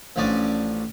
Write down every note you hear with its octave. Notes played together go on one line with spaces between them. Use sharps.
A1 F3 C#4 D4 D5 D#6